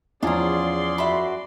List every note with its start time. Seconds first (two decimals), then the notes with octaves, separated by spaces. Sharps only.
0.23 E2 F3 C#4 F4 G#4 D5 A#5 C6
0.98 F#2 F#4 E5 B5